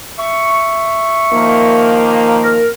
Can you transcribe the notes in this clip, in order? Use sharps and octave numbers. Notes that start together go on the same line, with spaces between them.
E5 C#6
D#3 F3 A#3
A#4